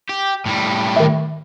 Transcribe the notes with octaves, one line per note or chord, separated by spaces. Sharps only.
G4
A2 G3
D#3 A3